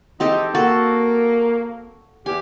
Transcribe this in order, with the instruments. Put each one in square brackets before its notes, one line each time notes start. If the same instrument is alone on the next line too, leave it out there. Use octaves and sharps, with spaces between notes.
[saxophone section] E3 G#3 D#4 [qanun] C4 G4 A4
[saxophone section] A#3 [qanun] F#4 A4
[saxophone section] E2 G4 [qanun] G#5